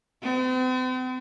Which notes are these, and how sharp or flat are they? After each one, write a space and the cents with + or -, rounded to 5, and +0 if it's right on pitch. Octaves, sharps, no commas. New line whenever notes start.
C4 -45